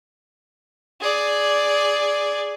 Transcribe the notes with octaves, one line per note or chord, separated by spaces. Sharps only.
G#4 D5